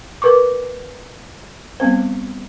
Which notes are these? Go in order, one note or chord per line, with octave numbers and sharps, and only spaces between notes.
A#4 B4 C#6 D6
G3 B3 C4 C5